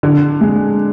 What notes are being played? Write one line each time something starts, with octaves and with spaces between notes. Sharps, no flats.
D3
G#3